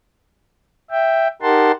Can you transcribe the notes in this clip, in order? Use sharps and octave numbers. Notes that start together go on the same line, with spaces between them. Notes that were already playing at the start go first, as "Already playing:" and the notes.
E5 G5
D#4 G4 A#4 F#5 A5 C6